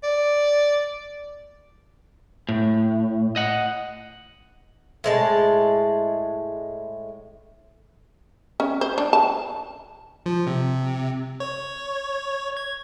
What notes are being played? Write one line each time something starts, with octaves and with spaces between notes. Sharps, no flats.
D5
A2
D#5 F#5
A2 G#3 A5
C#4
C5
D4
A5
F3
C3
C#5
G#6